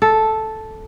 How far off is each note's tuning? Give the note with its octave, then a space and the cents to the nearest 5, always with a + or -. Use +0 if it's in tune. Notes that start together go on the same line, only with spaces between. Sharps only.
A4 -5